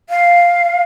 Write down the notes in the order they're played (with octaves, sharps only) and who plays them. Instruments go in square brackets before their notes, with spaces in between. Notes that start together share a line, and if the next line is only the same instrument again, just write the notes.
[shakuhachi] F5